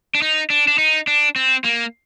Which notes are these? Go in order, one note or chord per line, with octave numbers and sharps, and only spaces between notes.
D4
D#4
D4
D4
D#4
D4
C4
A#3